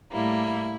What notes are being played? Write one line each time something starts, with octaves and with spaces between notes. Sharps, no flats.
A2 G3 A#3 E4